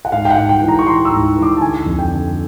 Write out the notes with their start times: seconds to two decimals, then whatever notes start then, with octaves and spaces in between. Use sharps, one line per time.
0.05 F#5
0.12 G#2 F5
0.25 G5
0.31 F#5
0.37 G#2
0.49 G5
0.62 E3
0.68 A#5
0.79 C#6
0.86 E3 C6
1.05 E6
1.11 G#2
1.36 E3
1.42 D6
1.57 A5
1.61 D3 G#5
1.86 F2
1.99 G5
2.11 D3